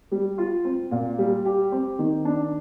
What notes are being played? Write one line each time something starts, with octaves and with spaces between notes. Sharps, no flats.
G3
F4
C4
A#2
G3
G4
C4
D#3
D4